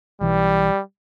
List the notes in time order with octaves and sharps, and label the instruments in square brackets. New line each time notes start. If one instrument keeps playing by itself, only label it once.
[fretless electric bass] B1 E3 [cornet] G3